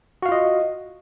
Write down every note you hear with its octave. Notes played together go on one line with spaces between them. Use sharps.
F4 F#4 D#5 F5